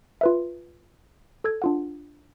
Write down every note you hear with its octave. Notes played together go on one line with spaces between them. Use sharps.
F4 B4 E5
A4 E6 G#6
D4 F4 F#5